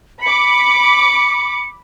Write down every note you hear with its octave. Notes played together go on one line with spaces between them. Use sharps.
B5 D6 C#7